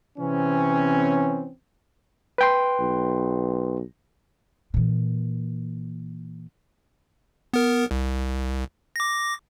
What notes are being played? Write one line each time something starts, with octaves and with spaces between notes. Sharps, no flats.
C3 E3 C4 C#4
B4 G5 C6
B1
A#2 E3
B3 A#4
C2
D6 A#6